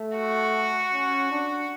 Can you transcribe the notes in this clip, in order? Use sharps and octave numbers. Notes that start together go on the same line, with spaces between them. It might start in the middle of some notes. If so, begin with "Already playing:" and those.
Already playing: A3
F#4
C#4
D4